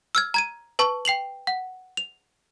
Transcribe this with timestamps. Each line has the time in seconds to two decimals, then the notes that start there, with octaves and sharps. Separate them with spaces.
0.15 E6 F6 G#6
0.34 A#5 G#6 D#7
0.79 B4 A5 C#6
1.05 G5 C7 F7 F#7
1.47 F#5
1.97 F7